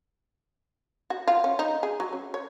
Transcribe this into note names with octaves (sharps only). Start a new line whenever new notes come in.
F#4
F4
C#4
D#4
G#4
F#3
C#4
C#5